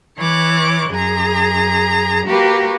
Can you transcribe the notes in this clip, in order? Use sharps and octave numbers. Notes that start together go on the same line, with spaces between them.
E3 C#5 D6 F#6
F#2 G#4 A#5
A#3 F#4 G4 B4